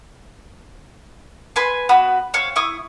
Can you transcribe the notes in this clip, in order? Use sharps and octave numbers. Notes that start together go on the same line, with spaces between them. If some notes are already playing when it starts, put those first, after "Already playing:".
B4 G#5 C6
B3 F#4 B5 D#6
C4 C#5 F5
E4 C#6 D#6